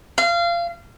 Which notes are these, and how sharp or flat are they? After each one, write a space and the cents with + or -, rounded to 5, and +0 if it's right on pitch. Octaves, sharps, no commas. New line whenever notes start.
F5 -25